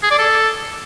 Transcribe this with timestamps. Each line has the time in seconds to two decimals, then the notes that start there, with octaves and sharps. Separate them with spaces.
0.03 G#4
0.11 D5
0.19 A4